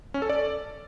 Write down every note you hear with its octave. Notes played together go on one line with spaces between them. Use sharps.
C#4
A4
D5